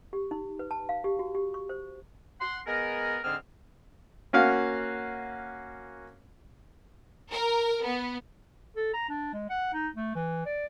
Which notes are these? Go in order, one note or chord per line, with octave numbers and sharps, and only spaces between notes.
G4
D#4
B4
A5
F5
G4
F#4
G4
C#6
C5
F#5 C6
G#3 B3 G#4 A#4
G#2 D3 C4 G#4 F6
A#3 C#4 F#4 F5
A#4
B3
A4
A#5
D4
G#3
F#5
D#4
A3
E3
D5